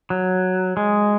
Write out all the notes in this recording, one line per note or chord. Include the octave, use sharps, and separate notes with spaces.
F#3
G#3